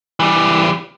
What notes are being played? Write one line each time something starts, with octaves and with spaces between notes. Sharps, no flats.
E3 G3